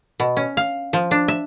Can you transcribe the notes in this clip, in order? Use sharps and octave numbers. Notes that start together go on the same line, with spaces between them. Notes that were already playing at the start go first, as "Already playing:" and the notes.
B2
C#4
F5
F3
D4
E5